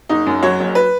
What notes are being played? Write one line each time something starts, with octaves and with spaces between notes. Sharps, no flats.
F#1 D#4
F#2
F#3 C#5
F#1
B4